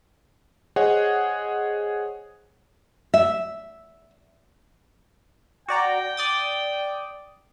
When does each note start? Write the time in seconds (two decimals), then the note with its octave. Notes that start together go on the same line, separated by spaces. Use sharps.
0.76 G#4 C5 C#5 D#5 F#5
3.14 E5
5.68 F#4 D5 G5 A#5
6.17 D5 D#6 A6